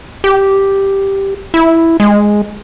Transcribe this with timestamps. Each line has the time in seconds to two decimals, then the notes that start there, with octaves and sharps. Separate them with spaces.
0.24 G4
1.54 E4
2.00 G#3